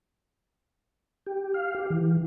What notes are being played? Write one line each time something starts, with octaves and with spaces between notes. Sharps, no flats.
G4
F5
G4
E3